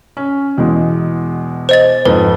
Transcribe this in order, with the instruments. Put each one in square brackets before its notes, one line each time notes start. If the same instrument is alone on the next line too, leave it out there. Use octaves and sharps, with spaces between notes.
[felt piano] C#4
E2 B2 G#3
[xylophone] C5 D#5 A6
[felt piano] F2 G#2 [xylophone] B4